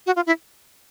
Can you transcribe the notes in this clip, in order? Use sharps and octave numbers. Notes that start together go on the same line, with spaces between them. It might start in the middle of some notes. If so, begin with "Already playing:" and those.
F#4
F4
E4